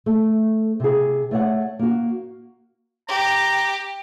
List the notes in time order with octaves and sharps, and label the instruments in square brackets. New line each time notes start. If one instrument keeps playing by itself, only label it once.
[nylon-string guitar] A3
C3 G#4
A3 C#5 F#5
A#3 F#4
[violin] G4 [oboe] A#5